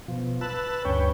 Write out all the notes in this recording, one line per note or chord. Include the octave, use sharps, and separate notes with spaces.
B2 F3
B4 A5 E6 F#6
D2 G2 C#4 B4 C#5 G5